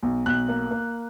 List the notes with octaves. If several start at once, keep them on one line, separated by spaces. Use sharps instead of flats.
B1
B1 F#6
A#3
A#3